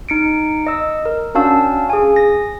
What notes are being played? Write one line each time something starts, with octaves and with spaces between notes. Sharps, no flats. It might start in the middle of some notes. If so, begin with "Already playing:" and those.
D#4 C#7 D7
D#5 E6
A#4
C#4 D4 F#4 F5 A5 E6
G#4 G#5
A#6